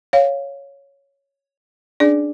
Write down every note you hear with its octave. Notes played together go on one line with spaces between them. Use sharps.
C#5 F5
C#4 D4 G#4 D5